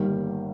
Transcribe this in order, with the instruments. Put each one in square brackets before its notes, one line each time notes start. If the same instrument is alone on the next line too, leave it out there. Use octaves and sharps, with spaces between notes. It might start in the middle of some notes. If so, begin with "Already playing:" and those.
Already playing: [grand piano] G1 G2 D#3 G3 A#3